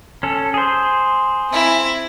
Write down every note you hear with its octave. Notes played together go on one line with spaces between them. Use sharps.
C#4 A4
G#4 C5
C4 E4